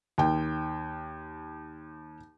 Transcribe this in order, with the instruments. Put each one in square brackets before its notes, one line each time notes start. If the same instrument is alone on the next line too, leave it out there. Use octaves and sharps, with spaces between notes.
[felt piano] D#2 G5